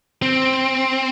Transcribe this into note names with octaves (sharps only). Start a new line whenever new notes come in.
C4